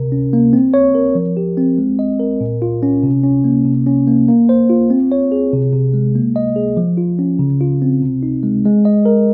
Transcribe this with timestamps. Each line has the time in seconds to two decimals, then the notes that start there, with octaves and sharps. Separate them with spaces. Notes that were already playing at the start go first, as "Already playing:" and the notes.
Already playing: C3 A#4
0.12 C#4
0.33 A#3
0.53 C4
0.74 C#5
0.95 A#4
1.15 F3
1.37 G4
1.57 C4
1.78 G#3
1.99 D#5
2.20 A#4
2.41 A#2
2.62 F4
2.83 C#4
3.03 C3
3.23 C#4
3.44 A#3
3.65 C3
3.87 C#4
4.07 A#3
4.28 A#3
4.49 C5
4.70 F4
4.90 C4
5.12 C#5
5.32 G#4
5.53 C3
5.73 C3
5.94 G#3
6.15 A#3
6.36 D#5
6.56 G#4
6.77 F3
6.98 F4
7.19 C#4
7.39 C#3
7.61 F4
7.82 C4
8.02 C3
8.23 D#4
8.43 G#3
8.65 G#3
8.85 D#5
9.06 A#4